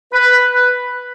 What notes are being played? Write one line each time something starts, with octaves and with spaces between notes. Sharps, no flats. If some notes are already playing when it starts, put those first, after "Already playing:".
B4